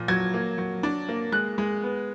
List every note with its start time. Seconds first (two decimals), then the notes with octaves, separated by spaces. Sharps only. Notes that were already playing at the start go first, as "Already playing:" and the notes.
Already playing: A#2 F3
0.08 F#3 G#6
0.34 A#3
0.58 F#3
0.83 D4
1.08 A#3
1.32 G#3 F#6
1.58 G#3
1.83 B3